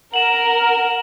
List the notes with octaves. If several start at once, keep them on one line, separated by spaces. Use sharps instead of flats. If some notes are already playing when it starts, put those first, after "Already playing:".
A#4 F#5 E7 F#7